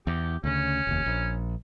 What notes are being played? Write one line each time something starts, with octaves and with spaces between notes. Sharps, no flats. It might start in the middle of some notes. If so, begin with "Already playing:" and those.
E2 G4
D2 C#3 C#4
F1 D#2
A#1